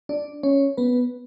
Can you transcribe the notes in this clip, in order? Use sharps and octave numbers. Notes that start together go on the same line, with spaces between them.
D4 D5
C#4 C#5
B3 B4